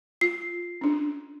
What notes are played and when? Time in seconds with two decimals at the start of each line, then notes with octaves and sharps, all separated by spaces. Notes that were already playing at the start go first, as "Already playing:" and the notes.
0.21 F4 C7
0.81 C#4 D4